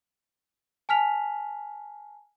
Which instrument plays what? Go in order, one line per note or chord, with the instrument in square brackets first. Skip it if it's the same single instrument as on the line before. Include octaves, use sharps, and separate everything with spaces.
[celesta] G#5 A5 F6 B6 F7